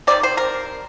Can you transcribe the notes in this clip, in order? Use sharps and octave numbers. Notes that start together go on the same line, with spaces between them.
C3 D#3 G3 C4 D5
C5
A#4